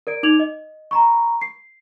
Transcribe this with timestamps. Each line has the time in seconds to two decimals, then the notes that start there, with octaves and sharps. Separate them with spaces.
0.07 A#4 D5 D7
0.23 D#4 D6 G#6 F7 F#7
0.40 D#5
0.91 A#5 B5 C#6
1.41 C7